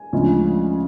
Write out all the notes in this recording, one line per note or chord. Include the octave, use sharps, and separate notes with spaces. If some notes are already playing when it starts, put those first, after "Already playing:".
Already playing: G#5
D2 C#3 F3 G#3